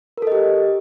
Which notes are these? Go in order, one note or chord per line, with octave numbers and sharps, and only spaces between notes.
G4 A4 A#4 D#5